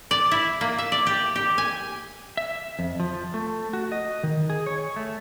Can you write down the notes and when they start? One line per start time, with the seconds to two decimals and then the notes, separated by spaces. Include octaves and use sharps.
0.11 D5
0.31 E4
0.61 A#3
0.78 E5
0.92 D5
1.07 G4
1.36 G4
1.58 G#5
2.37 E5
2.79 F2
3.00 F3
3.34 A3
3.73 F#4
3.92 D#5
4.23 D#3
4.50 G#4
4.67 C#5
4.96 A3